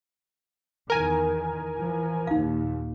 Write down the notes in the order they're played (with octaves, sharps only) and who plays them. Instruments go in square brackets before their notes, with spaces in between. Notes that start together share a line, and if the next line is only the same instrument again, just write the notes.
[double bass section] E2 D#3 [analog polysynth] A#4 G#5
[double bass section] E3 F3
[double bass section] D#2 A#2 [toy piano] D#4 F5